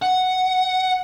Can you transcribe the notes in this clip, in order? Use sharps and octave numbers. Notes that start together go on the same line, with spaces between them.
F#5